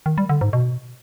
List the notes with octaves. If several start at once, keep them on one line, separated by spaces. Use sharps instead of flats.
D#3
G3
D3
G#2
B2